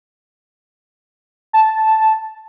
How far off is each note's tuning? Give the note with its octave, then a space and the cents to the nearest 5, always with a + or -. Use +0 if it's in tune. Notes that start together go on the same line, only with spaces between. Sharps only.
A5 -5